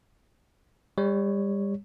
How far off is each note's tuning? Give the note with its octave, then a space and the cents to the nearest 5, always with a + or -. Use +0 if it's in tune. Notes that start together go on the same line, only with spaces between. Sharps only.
G3 +30 C#5 +0